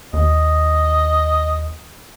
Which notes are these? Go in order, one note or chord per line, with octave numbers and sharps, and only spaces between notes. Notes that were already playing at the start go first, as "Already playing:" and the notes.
D#2 D#5